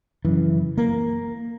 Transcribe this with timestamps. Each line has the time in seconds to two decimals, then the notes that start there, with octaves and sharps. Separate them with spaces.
0.25 F#2 C#3 E3
0.78 A#3 A#4